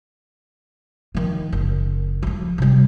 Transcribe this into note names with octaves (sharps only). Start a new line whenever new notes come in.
D#3 F3
F#1
F3 A3
C3 G3